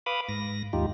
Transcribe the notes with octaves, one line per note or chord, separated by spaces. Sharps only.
B4 F5 B5 D6 D#6
G#2 A#6
D#2 G#2 D#4 F4 G4